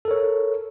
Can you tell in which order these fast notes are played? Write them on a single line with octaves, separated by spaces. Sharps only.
A4 A#4 C#5